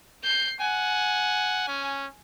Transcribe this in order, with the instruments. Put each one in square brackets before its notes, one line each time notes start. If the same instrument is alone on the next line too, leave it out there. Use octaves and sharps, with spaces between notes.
[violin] G6 C7
[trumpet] F#5 [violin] G#5
[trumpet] C#4